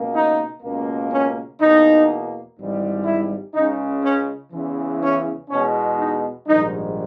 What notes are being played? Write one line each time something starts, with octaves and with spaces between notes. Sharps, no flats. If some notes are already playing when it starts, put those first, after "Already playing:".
Already playing: C#2 B2 A#3
D#4
C#2 B2 A#3
C#4
E2 B2 A#3 D#4
G#1 G#2 E3 G3
E4
C#2 C#3 G#3 D#4
C#4
E2 C#3 E3
C#4
E2 B2 G#3 C#4
D#4
A#1 G#2 D#3 G3 D#4